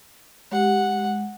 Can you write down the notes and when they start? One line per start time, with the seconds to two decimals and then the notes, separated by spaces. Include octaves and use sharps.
0.51 G#3 G4 F#5
0.99 G#3